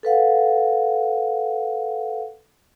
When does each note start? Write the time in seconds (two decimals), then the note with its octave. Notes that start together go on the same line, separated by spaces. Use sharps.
0.03 A4 B4 F5 F#5